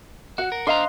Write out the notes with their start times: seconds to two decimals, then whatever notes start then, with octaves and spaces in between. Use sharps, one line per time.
0.38 F#4 F#5
0.52 A#4
0.67 D4 C5 D#5 F5 A#5 C6